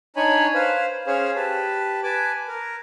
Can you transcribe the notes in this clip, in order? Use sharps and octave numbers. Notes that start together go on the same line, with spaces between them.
D4 D#4 C#5 G#5 B5
B4 C5 F5
C#4 G#4 C5 C#5 F5
G4 B4 A5
B4 G#5 A5 D6
A#4